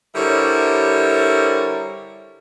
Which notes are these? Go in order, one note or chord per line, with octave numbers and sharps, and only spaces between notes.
D3 G3 E4 A#4 C5 C#5